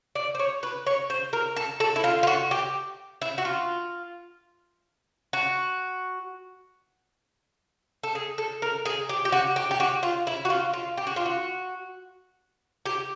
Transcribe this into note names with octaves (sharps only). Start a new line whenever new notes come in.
D5
C5
C#5
B4
C#5
C5
A#4
A4
A4
E4
F4
F4
F#4
G4
E4
F#4
F4
F#4
A4
G#4
A4
A#4
G#4
G4
G4
F#4
G4
G4
F#4
F4
E4
F#4
F4
F4
G4
F#4
F4
F#4
G4